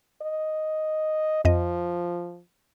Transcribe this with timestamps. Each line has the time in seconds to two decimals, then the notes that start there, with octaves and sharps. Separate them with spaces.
0.22 D#5
1.45 F2 F3 D#5